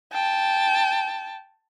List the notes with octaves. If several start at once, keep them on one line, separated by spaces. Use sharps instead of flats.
G5 A5